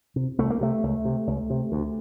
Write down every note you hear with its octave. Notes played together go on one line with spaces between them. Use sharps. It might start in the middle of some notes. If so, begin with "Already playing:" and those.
C3
C2 A3
A#3
C3 A3
C#2
C3
C#2
C3
D2